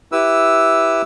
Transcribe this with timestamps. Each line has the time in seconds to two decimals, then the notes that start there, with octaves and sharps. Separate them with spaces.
0.12 E4 G4 B4 E6